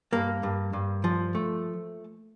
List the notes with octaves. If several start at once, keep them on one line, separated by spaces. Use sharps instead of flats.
G2 A#3
G2
G2
F3
A3